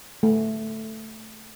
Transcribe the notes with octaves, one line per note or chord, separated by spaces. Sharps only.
A3